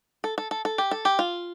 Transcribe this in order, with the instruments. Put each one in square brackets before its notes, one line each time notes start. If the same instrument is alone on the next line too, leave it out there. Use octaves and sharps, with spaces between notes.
[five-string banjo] A4
A4
A4
A4
G4
A4
G4
F4